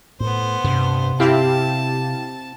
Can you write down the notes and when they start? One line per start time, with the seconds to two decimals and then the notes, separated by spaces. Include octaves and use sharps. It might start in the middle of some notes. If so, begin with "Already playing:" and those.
0.20 A2 B3 C5
0.64 G2 C3
1.20 C4 E4 G4 F5 A5